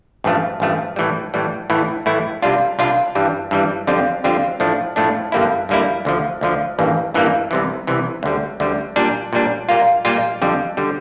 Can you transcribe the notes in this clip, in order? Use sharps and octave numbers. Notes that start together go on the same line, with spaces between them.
A1 G2 F3 A3
A1 G2 F3 A3
A2 E3 G3
A2 E3 G3
A2 E3 A3 E4
A2 E3 A3 E4
C2 C3 G3 D4 F4
C2 C3 G3 D4 F4
G2 E3 G3
G2 E3 G3
F2 D3 G3 C4 F4
F2 D3 G3 C4 F4
A2 F3 A3 D4
A2 F3 A3 D4
G2 D3 G3 A#3 E4
G2 D3 G3 A#3 E4
D2 D3 F3
D2 D3 F3
A1 G2 E3 G3 A#3
A1 G2 E3 G3 A#3
C2 C3 E3
C2 C3 E3
D2 D3 G3
D2 D3 G3
A#2 G3 D4
A#2 G3 D4
A#2 G3 A#3 F4
A#2 G3 A#3 F4
F2 D3 G3
D3 G3